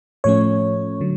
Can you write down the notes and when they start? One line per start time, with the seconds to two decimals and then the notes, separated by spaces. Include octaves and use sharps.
0.24 A2 F3 A3 C#4 C#5
1.01 D3 F#3